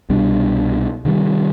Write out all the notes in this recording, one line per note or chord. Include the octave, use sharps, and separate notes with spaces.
C2 B2 G3 D4
C3 D#3 G3